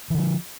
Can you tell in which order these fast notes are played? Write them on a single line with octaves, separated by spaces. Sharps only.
E3 D3 F3